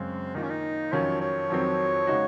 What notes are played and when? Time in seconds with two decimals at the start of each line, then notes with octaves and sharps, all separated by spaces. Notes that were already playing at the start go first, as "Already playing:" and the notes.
Already playing: F#2 C#3 G#3 C4
0.35 D#3 A#3 D#4 F4
0.43 C#4
0.50 D#4
0.92 F2 D#3 F#3 C#4 F4 C#5
1.21 C#5
1.50 F2 D#3 F#3 C4
2.07 C#3 G#3 D#4 F#4